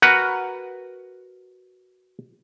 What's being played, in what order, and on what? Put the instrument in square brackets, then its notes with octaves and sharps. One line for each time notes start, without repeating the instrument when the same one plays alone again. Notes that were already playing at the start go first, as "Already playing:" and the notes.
[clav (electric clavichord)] F#4 A#4 B4 F#5